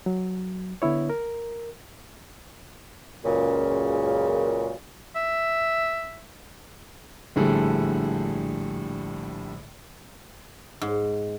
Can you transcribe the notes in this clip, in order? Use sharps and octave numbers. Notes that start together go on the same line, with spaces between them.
F#3
D3 B3 E4 C#5
A#4
C#2 F#2 A#2 C#3
E5
A#1 A2 D3 G3 G#4 A4
G#2